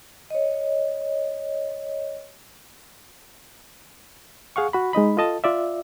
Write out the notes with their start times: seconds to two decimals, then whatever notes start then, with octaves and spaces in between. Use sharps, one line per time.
0.30 C#5 D#5
4.56 G#4 F5 F#5 C#6
4.73 F#4 B5
4.93 G#3 D#4 D#5 B5
5.17 F4 A4 D#5 A5
5.44 F4 D5 E5